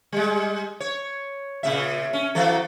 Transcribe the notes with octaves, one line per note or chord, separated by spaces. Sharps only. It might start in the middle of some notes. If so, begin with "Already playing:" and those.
G3 G#3
C#5
A#2 C#3 E5
C#4
E3 F#3 A4